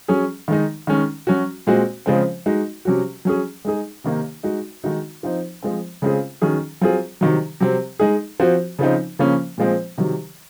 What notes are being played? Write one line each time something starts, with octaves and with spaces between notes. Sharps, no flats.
F#3 C#4 G#4
D#3 G#3 D#4
D#3 G#3 C#4
F#3 C#4 F#4
A#2 G#3 C4 F#4
C#3 F3 G#3 C4
G#3 D#4 F#4
C3 F#3 C#4 F#4
F#3 C#4 G#4
G#3 D#4 G#4
C3 D#3 A#3 D#4
G#3 D#4 F#4
D#3 G#3 D#4 F#4
F3 C4 D#4
F3 G#3 C4
C#3 G#3 C4 F4 G#4
D#3 F#3 C#4 G#4
F#3 C4 F4 G#4
C3 D#3 F#3
C3 F#3 C4
G#3 D#4 G#4
F3 C4 F#4
C#3 F3 C4 D#4
C#3 F3 A#3 C#4
A#2 F3 G#3 C4
C3 D#3 F#3